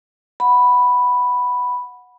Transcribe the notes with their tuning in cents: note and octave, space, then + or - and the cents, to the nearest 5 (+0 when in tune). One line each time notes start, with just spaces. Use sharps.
F#5 -10 B5 +0